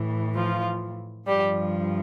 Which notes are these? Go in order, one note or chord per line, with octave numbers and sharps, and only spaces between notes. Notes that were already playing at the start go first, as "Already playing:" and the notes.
Already playing: A2 E3
F3 F4
G2 F3 G3 G4